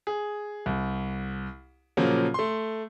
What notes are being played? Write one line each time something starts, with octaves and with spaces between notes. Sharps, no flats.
G#4
C2
A#2 C#3 F3 F#3 A#3
A3 C6